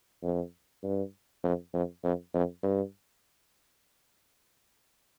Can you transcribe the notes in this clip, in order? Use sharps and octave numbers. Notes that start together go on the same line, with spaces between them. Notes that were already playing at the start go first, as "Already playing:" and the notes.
F2
G2
F2
F2
F2
F2
G2